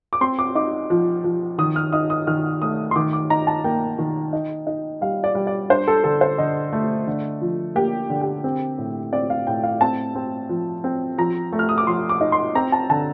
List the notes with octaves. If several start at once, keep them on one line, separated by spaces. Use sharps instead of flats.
D6
C4 C6
D6
D#4 D6
F3
F3
D#3 D#6
F6
D#4 D#6
D#6
D#3 F6
A3 D#6
C6
D#3 D6
D6
D#4 A#5
A5
A#3 G5
D#3
D#4
D#4
G3 F5
D5
G3
D5
D4 C5
A4
D3 A4
C5
D3 D#5
A3
D3
F3
A#3 G4
D3
G4
C4
A2
C4 D5
F5
A2 G5
F5
C4 A5
C4
F3
C4
F3 A#5
A3
F6
D#6
D6
F3 C6
D6
D#4
C6
C4 A#5
A5
D3 A5